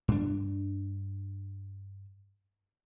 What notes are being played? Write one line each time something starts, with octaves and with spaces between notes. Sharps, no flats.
G2 D4